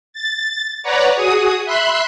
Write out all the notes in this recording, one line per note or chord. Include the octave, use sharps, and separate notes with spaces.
A6
B4 C#5 D5 F#5 A#5
F#4 G#4 D#6
E5 B5 C6 F#6